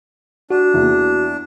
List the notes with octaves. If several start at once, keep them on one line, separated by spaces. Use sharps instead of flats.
D4 F#4
E2 E3 A#3